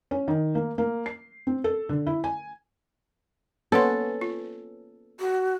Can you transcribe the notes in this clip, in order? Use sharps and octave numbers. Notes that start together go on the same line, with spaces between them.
C#4
D#3
A#3
A#3
C7
C4
A4
D3
E4
G#5
A#3 B3 C#4 A4 F#5 C6
F4
F#4